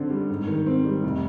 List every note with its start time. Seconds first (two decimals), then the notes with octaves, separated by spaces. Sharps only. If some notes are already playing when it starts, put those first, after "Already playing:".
Already playing: F#2 D3 C4
0.10 G3
0.29 G#2
0.47 D#3
0.66 C4
0.85 G3
1.04 F1